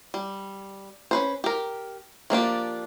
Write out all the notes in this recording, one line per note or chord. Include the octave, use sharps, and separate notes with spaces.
G3
C#4 B4 C5
G4 A#4
F3 A#3 D4 G4